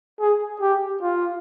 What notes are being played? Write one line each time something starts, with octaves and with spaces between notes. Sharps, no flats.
G#4
G4
F4